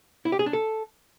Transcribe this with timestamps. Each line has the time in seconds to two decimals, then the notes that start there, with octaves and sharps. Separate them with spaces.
0.25 E4
0.32 G4
0.39 G#4
0.46 D4
0.53 A4